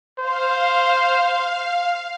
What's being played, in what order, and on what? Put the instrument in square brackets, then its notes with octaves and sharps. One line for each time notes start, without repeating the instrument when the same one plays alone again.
[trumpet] C5 [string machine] F5